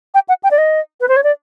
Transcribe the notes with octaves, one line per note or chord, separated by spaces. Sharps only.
G5
F#5
G5
D5
D#5
B4
C5
C#5
D5